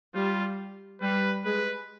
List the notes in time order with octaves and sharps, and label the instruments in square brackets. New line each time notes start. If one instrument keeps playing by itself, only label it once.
[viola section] G3 [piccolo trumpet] F4
[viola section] G3 [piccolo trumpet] B4
[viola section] G#3 [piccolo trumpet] B4